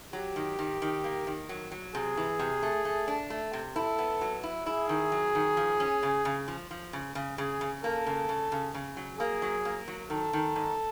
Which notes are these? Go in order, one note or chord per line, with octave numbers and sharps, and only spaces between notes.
F#3 G4
D#3
D#3
D#3
A#3
D#3
F#3
F#3
C3 G#4
E3
C3
A3
A3
D4
A3
C3
E4 A4
B3
F#3
E4
E4 G#4
D#3
F#3
D#3
F3
C#4
C#3
C#3
F3
F3
C#3
C#3
C#3 G#4
C#3
A#3 A4
C#3
C#3
C#3
C#3
F#3
A#3 G#4
F#3
A#3
F#3
D#3 A4
D#3
G#2